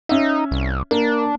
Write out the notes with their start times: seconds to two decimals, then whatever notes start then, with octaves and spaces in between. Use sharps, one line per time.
0.09 C#4 D#4 E5
0.51 C2
0.91 A#3 D4